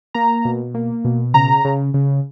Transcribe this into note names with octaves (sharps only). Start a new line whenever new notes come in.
A#3 A#5
B2
A#3
B2
C#3 A#5
C#3
C#3